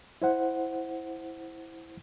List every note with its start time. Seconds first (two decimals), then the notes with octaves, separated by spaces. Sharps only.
0.22 E4 C5 F#5